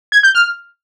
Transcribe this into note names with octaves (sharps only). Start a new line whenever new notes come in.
G#6
G6
F6